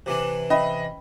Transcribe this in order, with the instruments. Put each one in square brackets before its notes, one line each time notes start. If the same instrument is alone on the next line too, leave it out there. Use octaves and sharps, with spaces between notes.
[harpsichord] C3 E3 D4 [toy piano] C5 D6
[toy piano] C#4 B5 [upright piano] D#5 E5